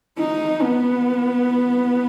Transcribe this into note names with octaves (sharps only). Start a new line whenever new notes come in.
D#4
B3